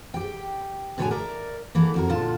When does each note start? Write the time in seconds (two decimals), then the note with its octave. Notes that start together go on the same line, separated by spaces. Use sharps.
0.14 G4 G5
0.98 A2 D3 F#4 B4 C#5 G#5
1.11 A#4 D5 E5
1.75 E3 A#3 B3 A4
1.94 F2 F#4 A#4
2.09 A#2 D3 F4 F#4 A5